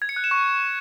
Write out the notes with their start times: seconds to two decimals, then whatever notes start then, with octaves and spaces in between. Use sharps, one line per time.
0.02 G#6
0.09 C#7
0.16 F#6
0.24 E7
0.31 C#6